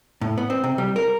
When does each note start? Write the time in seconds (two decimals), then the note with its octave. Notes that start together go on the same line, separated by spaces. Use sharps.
0.21 A2
0.38 B3
0.50 C4
0.64 C3
0.78 G3
0.96 A#4